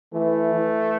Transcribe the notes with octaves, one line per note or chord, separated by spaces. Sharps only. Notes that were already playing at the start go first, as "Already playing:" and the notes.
E3 A3
E3